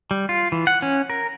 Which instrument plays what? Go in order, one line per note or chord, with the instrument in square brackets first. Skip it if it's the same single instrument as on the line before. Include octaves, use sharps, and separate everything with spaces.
[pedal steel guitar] G3
F4
E3
F#5
C#4
A#4